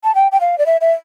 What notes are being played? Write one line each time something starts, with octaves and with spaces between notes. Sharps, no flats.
A5
G5
G5
F5
D5
E5
E5